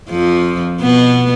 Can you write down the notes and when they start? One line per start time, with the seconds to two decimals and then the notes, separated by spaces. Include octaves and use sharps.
0.10 F2 F3
0.81 B2 B3